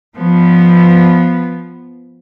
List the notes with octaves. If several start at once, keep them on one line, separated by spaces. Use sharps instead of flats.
F3 B3